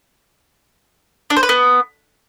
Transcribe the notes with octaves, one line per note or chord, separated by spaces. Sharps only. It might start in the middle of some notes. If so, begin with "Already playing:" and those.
D4
C5
B4
B3